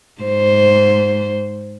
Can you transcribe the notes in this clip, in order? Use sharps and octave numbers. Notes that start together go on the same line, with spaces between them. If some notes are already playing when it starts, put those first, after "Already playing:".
G#2 C5